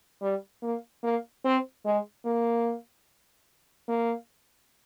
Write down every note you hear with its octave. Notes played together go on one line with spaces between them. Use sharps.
G3
A#3
A#3
C4
G#3
A#3
A#3